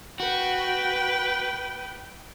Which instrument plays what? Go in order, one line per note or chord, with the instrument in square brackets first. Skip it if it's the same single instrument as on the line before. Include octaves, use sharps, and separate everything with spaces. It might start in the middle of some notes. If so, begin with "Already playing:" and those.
[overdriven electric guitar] F#4 [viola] B4 G5